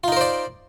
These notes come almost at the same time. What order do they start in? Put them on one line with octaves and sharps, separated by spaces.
F4 D#4 A#4 C5 D5